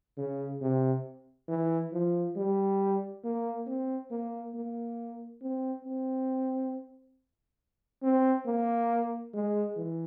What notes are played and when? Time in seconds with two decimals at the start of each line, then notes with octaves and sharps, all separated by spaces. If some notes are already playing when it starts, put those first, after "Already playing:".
0.18 C#3
0.61 C3
1.48 E3
1.93 F3
2.36 G3
3.24 A#3
3.66 C4
4.11 A#3
4.54 A#3
5.42 C4
5.85 C4
8.03 C4
8.46 A#3
9.34 G#3
9.77 E3